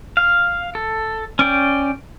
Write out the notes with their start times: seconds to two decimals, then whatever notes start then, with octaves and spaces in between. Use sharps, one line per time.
0.17 F5
0.75 A4
1.39 C#4 D5 G5